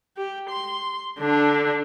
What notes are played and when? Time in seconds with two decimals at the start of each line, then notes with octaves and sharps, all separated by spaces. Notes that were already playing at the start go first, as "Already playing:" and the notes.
0.17 G4
0.50 C6
1.19 D3 D4